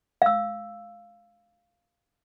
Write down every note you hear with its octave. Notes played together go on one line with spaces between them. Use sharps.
F5 E6